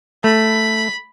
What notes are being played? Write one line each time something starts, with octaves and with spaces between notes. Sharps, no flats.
A3 B5